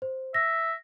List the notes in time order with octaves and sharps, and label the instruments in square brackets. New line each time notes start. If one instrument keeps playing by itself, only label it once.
[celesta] C5
[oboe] E5 [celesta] A#6